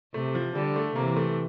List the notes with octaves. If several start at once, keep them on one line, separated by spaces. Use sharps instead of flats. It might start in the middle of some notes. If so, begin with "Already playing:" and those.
C3 A3
F3
D3 G3
A3
C3 E3 A#3
A3